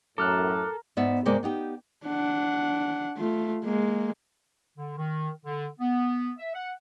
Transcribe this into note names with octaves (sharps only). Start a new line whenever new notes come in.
F#2 A2 A4 A#4 D6 F6 F#6
G#2 B3 D5 E5
G2 C3 G#3 A#3 D5
B3 D#4 G4
D4 F#5
A3 F4
G#3 A#3
D3
D#3
D3
B3
E5
F#5